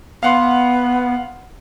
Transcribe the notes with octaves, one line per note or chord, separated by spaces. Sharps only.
B3 F5 F#5 C6